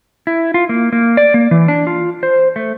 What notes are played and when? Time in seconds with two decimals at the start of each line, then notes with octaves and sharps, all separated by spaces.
0.27 E4
0.54 F4
0.69 A#3
0.92 A#3
1.17 D5
1.34 A#3
1.51 E3
1.68 D4
1.87 F4
2.23 C5
2.56 A3